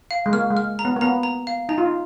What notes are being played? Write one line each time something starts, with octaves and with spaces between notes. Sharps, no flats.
F5
G#3
A#3 F6
G#3
F6
A#5
B3
A#3
B3 A#5
A#5
F5
D#4 A#5
F4
D#4